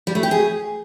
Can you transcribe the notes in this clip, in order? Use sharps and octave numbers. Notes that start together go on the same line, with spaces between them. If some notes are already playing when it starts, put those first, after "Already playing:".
G3
A3
G4
G#4